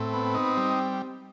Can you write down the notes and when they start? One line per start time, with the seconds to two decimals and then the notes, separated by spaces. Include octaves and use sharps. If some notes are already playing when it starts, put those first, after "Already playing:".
Already playing: A2 C4
0.13 B3
0.34 D#4
0.57 G3